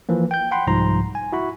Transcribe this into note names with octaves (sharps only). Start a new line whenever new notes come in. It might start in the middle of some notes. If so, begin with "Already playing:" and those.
E3 F3 A#3
G5 G6
F#5 G5 B5 C6
C2 G#2 F3 A#5 C6
G#5
E4 F#4 B5